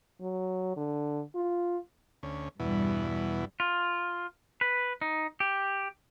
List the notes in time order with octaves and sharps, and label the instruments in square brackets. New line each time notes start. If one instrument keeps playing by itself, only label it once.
[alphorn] F#3
D3
F4
[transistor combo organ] D2 C#4
[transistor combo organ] E2 B2 E4 [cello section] G2 G3
[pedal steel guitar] F4
B4
D#4
G4